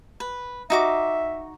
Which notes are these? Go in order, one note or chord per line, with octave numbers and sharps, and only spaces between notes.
B4
D#4 F#4 E5 D6